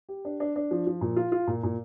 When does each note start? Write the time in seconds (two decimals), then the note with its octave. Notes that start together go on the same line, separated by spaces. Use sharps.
0.09 G4
0.25 D4
0.40 D4
0.56 D4
0.71 F3
0.87 F3
1.01 A#2
1.16 F4
1.32 F4
1.47 A#2
1.63 A#2